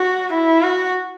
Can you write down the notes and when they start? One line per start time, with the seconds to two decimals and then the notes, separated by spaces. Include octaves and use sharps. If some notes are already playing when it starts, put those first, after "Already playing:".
Already playing: F#4
0.33 E4
0.62 F#4